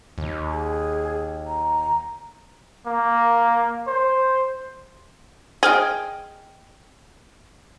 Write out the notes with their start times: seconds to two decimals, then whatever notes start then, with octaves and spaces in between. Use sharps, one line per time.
0.18 D#2
0.53 G#4
1.47 A#5
2.87 A#3
3.87 C5
5.63 G#4 D#5 F5 G5